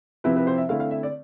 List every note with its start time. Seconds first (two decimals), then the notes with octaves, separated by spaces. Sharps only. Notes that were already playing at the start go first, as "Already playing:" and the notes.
0.24 C3 F3 C4 E4 B4
0.36 B4
0.47 C5
0.58 E5
0.69 D3 A3 C4 E4 F5
0.80 F5
0.91 E5
1.03 D5